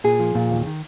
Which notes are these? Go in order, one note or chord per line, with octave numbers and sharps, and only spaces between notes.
A#2 G#4
F3
A#2
D#2
D#3